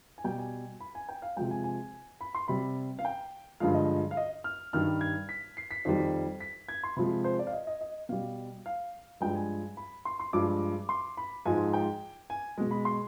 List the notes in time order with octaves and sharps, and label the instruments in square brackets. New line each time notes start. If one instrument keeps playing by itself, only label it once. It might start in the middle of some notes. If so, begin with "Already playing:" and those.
[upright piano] G#5
B2 G3 G5
G#5
B5
G#5
G5
F5
C3 F3 G#3 G5
G#5
G#5
B5
C6
C3 G3 B5
F5
G5
G2 D3 F3 G#3 F5
D#5
F5
D#5
F6
G2 D#3 G3 F6
G#6
B6
C7
B6
F2 D#3 G3
B6
G#6
C6
C3 F3 G#3 B5
C5
D5
F5
D#5
D#5
D#5
B2 G3 F5
F5
G2 F3 G#3 G5
G#5
B5
C6
C6
G2 F3 G#3 D6
C6
B5
G#2 F3 G#3 G#5
G5
G#5
B2 G#3
B5
C6